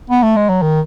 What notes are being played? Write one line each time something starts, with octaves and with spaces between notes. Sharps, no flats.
B3
A3
G#3
F#3
D#3